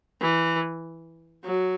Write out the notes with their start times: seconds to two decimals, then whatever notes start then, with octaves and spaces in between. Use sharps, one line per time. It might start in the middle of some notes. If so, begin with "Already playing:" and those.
0.21 E3
1.44 F#3